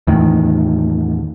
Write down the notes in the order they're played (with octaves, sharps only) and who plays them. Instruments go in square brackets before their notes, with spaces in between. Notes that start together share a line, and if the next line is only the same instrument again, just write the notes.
[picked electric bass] E2 A2 D#3